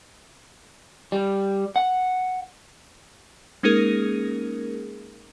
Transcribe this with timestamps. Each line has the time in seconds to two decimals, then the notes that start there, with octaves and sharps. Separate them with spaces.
1.12 G3
1.76 F#5
3.63 G#3 A#3 C#4 D#4 G#4 A#4